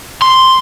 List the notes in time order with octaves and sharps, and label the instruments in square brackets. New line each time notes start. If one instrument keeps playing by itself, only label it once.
[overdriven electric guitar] C6